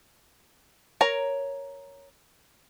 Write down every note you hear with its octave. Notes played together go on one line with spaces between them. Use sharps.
A#4 C#5 A#5